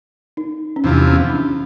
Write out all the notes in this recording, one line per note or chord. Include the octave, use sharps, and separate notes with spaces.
D#4
C#4
E2 C3 F3 D4
C#4
D4